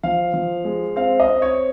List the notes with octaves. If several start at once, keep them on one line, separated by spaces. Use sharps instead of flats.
F3 F5
F3
G#3
C4 F5
D#5
C4
C#5